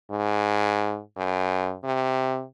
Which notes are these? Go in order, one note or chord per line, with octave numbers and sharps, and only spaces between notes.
G#2
F#2
C3